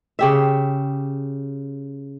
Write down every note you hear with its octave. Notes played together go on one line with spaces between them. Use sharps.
C#3 G4 E5